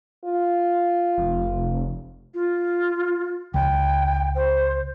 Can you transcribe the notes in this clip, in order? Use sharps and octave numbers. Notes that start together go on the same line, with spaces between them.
F4
F1
F4
C#2 G5
C5